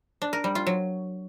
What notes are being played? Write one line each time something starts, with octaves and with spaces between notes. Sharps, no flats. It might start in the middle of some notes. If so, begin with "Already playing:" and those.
D4
A#4
G3
F4
F#3